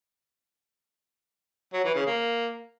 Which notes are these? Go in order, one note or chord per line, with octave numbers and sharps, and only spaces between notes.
F#3
E3
C#3
A#3